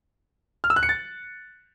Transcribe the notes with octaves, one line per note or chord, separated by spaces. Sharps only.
F6
E6
F#6
C#7
A6